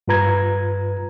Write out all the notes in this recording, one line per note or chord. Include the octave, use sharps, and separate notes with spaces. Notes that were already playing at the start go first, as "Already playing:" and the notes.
G2 F4 B4 A#5 G#6